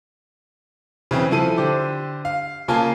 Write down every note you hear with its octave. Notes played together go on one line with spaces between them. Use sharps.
C#3 E3 C4
F3 E4 A4 D#7
D3 G4 C5 D6
F5
C#3 A#3 F4 G#5 A5